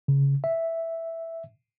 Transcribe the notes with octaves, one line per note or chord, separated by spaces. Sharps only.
C#3
E5